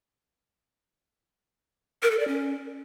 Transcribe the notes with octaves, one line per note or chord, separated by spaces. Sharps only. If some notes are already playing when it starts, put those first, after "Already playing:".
A#4
A4
D5
C#4